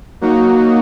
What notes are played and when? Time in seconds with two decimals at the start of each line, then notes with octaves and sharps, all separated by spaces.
0.21 F#3 A#3 D#4 F#4